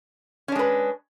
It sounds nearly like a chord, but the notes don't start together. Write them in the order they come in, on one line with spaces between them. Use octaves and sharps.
C#4 D4 G#3 B4